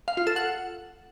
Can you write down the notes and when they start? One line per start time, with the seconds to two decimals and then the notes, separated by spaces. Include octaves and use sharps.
0.08 F5
0.17 F4
0.27 A4
0.36 F#5